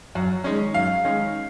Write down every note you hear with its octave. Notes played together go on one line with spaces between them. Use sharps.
F#2
D#3 G#3 C#4
F#2 F5
D#3 G#3 C#4